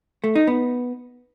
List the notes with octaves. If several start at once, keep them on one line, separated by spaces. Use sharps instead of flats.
A3
D#4
B3